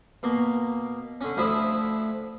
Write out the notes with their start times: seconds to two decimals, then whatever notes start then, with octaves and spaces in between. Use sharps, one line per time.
0.23 B2 A#3
1.21 D3 C#4
1.37 D2 F3 E4 B5 D#6